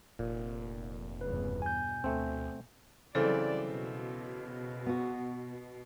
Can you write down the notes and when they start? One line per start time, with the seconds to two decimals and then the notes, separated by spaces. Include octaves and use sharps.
0.19 F1 A#2
1.21 E2 G2 C#3 B4
1.62 B2 G#5 G6
2.04 D2 A3 C4
3.15 C#3 E3 F#3 G3 C4 A4 D5
3.67 B2
4.86 B3 F#4